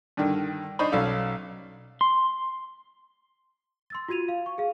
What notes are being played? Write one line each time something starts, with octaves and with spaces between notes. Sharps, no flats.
G2 D3 D#3
D4 D#4 C5 D#5 B5 C#6
B1 C#4 A4 D5 F5
C6
C6 E6 A6
F4 F#4 G#6 D#7 F7
F5
C#6
G#4 F5